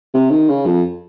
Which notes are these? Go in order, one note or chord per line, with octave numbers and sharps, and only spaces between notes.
C3
D#3
C#3
F2